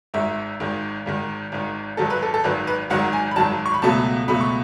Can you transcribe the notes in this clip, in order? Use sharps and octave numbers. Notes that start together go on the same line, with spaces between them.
G#1 G#2 D#3 E5
G#1 G#2 D#3
G#1 G#2 D#3
G#1 G#2 D#3
G#1 G#2 D#3 F#3 A4
B4
A4
A4
G#1 G#2 D#3 F#3 B4
B4
G#1 G#2 D#3 F#3 F#5
G#5
B5
G#1 G#2 D#3 F#3 A5
C#6
B5
C#2 B2 F#3 A3 A5
C#2 B2 F#3 A3 B5
C#6